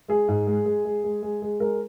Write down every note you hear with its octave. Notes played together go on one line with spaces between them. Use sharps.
G#3 G#4
G#2
G#3
G#3
G#3
G#3
G#3
G#3
G#3 A#4